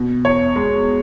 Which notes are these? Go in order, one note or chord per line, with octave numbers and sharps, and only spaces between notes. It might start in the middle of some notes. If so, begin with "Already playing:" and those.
Already playing: B2
E2 C#5
G#3